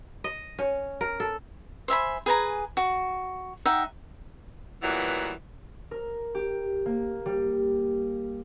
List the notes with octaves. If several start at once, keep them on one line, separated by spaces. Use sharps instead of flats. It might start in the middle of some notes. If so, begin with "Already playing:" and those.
D#5
C#4
A#4
A4
C5 E5 G#5 B5
G#4 B4 G#5 A#5
F#4
D#4 E5 F#5 G5
A#2 E3 F#3 G3 B3
A#4
G4
A#3
G3